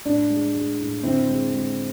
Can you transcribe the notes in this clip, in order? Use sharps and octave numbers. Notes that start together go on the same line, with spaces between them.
A2 D4
G#3
G#3
A2
D3 C4 E4
G#3
G#3